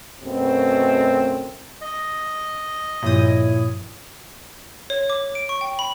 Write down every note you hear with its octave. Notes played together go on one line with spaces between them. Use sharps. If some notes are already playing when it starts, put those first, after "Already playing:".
F#2 B2 A3 C4
D#5
G2 A#2 F3 E4 C#5 D#6 G6
C#5
D6
D7
C#6
G5
B5